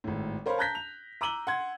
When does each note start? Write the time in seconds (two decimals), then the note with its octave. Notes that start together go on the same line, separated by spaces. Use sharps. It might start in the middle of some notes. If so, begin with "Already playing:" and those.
0.04 G#1 A2
0.46 A#4 C5 C#5 F5 B5
0.58 A5 A#5 F#6 G6 A#6 B6
0.75 F7
1.21 A#5 D6 E6 D#7 F#7 G7
1.47 F#5 C6 G#6